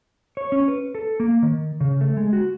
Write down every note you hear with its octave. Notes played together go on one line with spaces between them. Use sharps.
C#5
C#4
B4
A4
A#3
D#3
C#3
A3
G#3
F#4